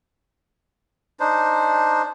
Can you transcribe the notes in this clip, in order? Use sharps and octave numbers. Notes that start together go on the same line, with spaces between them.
D4 D#4 C5